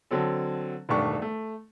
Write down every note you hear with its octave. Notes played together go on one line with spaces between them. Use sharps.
D3 F#3 C4 A4
E1 G2 D#3 A3 D4 C#6
A3